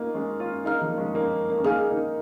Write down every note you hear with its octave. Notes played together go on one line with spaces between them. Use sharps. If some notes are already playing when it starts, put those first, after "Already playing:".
Already playing: A#3 C#4 D#4 F4
G#3 C#4
C#4 F4
A#3 D#4 G#4 F5 A#5 F6
F3 A#3
A#3
G#3 C#4
A#3 D#4
A#3
C#4
A#3 D#4 G#4 F5 G#5 F6
A#3 D#4